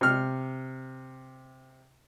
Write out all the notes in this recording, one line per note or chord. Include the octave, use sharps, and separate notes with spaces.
C3 F6